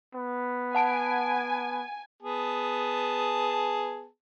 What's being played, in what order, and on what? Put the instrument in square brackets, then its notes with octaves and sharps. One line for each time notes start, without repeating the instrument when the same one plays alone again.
[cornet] B3
[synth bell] F#5 A5 D7 [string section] G#5
[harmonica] B3 G#4 A5